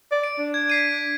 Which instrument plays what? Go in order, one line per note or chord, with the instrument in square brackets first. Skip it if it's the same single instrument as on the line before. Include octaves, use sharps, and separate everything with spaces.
[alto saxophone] D5
[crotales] D7
[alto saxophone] D4
[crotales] G#6
B6 C7 D#7